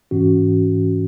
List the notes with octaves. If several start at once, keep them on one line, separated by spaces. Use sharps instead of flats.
G#2 E3 C#4 F#4